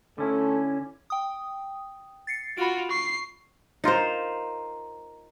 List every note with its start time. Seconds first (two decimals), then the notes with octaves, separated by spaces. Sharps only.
0.18 D3 A3 C#4 E4
1.10 G5 D#6
2.27 A6 C7 C#7
2.57 F4 F#4 B5 D7
2.91 C#6 C7
3.84 D#4 F4 A#4 C5